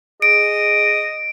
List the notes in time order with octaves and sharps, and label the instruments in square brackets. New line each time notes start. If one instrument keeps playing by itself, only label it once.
[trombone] G#4 [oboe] D#5 [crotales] D7